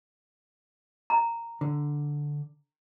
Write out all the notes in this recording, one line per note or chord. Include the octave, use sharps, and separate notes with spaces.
A#5
D3